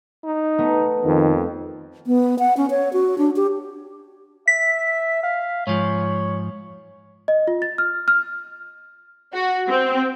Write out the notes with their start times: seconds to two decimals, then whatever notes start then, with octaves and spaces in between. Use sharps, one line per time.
0.24 D#4
0.58 A3 B3
1.05 F2 D#3
2.07 B3
2.39 F#5
2.57 C#4
2.70 C#5
2.93 F#4
3.18 D4
3.36 G4
4.48 E5 B6
5.23 F5
5.67 G#2 F3 C#5
7.28 D#5
7.47 F4
7.62 A6
7.78 F6
8.08 F6
9.34 F#4
9.70 C4